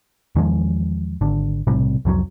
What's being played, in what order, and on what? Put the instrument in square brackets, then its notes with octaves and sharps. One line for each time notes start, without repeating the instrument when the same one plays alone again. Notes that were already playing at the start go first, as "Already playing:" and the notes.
[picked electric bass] E2 D#3 F3 G#3
G#1 D3
B1 A2 C3 G3
C2 F2 F3 F#3